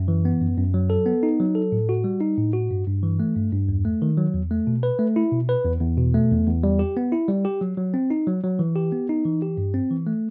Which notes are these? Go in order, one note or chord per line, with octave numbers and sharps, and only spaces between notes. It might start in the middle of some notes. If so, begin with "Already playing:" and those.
Already playing: F#2
E3
B3
F#2
F#2
F#3
A4
B3
D#4
F#3
A4
A2
F#4
G3
D#4
A2
F#4
G2
G2
E3
A3
G2
G2
E2
A3
D#3
F#3
E2
A3
B2
B4
A3
E4
B2
B4
E2
E2
B2
A3
E2
E2
G3
G4
B3
E4
G3
G4
F#3
F#3
C4
D#4
F#3
F#3
E3
G4
B3
D#4
E3
G4
G2
C4
E3
A3